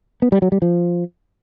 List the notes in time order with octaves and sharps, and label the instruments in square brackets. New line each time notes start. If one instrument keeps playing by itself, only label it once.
[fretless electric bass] B3
G3
F#3
G3
F3